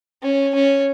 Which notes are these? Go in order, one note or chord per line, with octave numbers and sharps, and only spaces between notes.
C#4
C#4